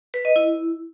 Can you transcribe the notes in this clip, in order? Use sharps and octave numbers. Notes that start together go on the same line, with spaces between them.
B4
D#5
E4